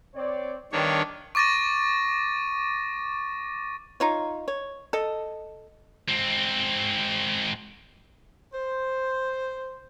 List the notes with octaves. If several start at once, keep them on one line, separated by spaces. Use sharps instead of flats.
C4 C#5 D5
E2 G2 D#3 D4 C#5
C#6 D6 A6 A#6 D#7
D#4 F4 C#5
C#5
A4 D#5
G#2 C4
C5